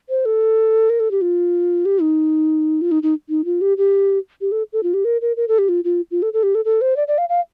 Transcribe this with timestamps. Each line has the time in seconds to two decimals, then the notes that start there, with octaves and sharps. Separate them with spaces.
0.09 C5
0.25 A4
0.90 A#4
1.00 A4
1.11 G4
1.21 F4
1.85 G4
2.01 D#4
2.81 F4
2.91 D#4
3.03 D#4
3.29 D#4
3.45 F4
3.61 G4
3.78 G4
4.41 G4
4.52 A4
4.73 A4
4.83 F4
4.94 G4
5.05 A#4
5.22 A#4
5.37 A#4
5.48 A4
5.58 G4
5.69 F4
5.84 F4
6.11 F4
6.22 A4
6.33 A4
6.43 G4
6.55 A4
6.65 A4
6.81 C5
6.97 D5
7.08 D5
7.18 F5
7.29 F5